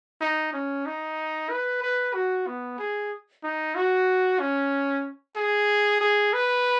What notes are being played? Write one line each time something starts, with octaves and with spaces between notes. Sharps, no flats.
D#4
C#4
D#4
B4
B4
F#4
B3
G#4
D#4
F#4
C#4
G#4
G#4
B4